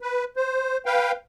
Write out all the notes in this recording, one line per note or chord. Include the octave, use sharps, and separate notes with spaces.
B4
C5
B4 F5 G5